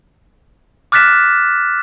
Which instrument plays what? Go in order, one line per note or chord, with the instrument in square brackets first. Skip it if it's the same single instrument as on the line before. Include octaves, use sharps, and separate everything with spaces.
[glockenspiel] D6 F6 F#6 A6 B6 E7